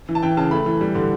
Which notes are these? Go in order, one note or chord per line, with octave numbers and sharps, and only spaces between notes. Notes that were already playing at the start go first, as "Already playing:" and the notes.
E3
A5
E3 G5
C#3 A5
A3 B5
E3
G3
D3